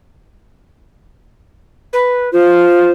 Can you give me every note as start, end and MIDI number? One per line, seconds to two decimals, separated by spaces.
1.93 2.29 71
2.33 2.92 65
2.33 2.91 72